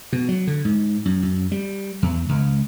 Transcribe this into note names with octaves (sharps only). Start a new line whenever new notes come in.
B2
F#3
D3
G#2
F#2
F#2
G3
E2
C#2